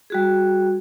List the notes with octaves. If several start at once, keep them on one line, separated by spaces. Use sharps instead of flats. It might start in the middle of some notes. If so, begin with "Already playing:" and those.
G3 F#4 G#4